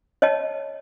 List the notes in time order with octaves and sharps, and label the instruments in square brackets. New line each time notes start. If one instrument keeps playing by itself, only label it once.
[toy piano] C#5 D#5 A5